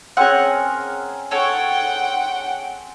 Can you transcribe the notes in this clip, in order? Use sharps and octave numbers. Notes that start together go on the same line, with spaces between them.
C4 C#4 G#4 A#4 F#5
A4 C#5 F#5 G5